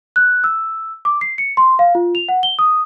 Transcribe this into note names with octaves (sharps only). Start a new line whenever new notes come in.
F#6
E6
D6
C7
C#7
C6
F5
F4
F7
F#5
G7
D#6